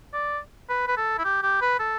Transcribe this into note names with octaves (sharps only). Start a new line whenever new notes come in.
D5
B4
B4
A4
E4
G4
G4
B4
A4